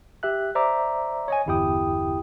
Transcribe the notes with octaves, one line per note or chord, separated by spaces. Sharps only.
G4 E5 F#6
C5 D5 E5 A#5 D6
C#5 D#5 G#5
G1 E2 E4 G4 G5 D#6